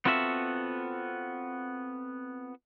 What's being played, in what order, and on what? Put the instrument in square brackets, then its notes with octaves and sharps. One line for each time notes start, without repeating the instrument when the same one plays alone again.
[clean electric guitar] B3 C4 F4 F#4 A4 E5